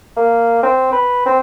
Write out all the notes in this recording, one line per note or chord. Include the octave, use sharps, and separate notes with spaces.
A#3
C4
B4
C4